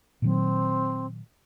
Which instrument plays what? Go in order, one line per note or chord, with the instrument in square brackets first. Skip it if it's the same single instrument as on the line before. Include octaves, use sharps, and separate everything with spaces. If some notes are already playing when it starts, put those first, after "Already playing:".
[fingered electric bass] A#2 D#3 F#3 [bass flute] C4